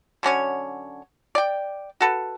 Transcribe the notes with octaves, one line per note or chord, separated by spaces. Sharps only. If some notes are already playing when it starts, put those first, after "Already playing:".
D3 F#3 C#4 C#5
D5 G5
F#4 A4 B4